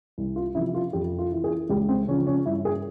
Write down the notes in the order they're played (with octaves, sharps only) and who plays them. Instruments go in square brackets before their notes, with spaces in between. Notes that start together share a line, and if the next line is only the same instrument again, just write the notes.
[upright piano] C2
F4
C3 F3 E4
F4
F2 G4
F4
E3
G#4
C#2 G4
C4
C#3 F3 C#4
C#4
G2 E4
G#4